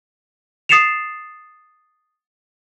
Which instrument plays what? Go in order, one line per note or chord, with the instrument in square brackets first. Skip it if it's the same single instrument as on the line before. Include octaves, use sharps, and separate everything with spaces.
[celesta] D#6 A6 C7 C#7 E7 F7